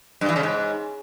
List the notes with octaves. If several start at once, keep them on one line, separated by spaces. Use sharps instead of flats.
G2
E3
C#3
G#2